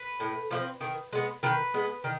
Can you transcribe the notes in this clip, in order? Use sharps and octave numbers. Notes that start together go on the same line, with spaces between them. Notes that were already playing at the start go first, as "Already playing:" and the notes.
Already playing: B4
A2
F3 A3 C4
D#3
G#3 B3
D#3 B4
G#3 B3
D#3